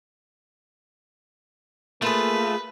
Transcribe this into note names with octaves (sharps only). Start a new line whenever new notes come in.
A3 A#3 F4 G#4 B4